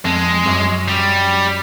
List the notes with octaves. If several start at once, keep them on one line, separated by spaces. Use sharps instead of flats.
F2 G#3
F#2
G3